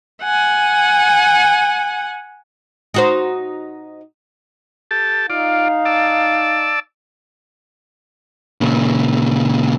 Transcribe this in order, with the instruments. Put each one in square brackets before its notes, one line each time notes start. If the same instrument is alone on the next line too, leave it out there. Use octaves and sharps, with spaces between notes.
[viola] F#5 G#5
[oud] D#4 F#4 C5
[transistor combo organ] G4 A4 A5
[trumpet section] D#4 F5 [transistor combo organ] F4 D5
[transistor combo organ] D5 A5 E6
[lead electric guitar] A#2 C#3